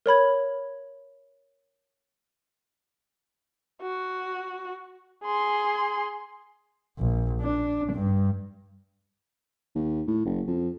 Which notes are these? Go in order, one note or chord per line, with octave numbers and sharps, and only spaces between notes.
A#4 C#5 B5 G#6
F#4
G#4 C6
A#1
D4
G2
D#2
A2
F#1
F2